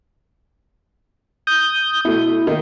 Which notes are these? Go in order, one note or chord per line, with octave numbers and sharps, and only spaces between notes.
D#6 G6
B2 A3 E4
D#3 A#3